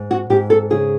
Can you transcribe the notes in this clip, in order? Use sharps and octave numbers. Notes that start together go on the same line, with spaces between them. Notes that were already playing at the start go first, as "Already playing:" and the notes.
Already playing: G#2
F#4
G#2 G4
A4
C#3 G#4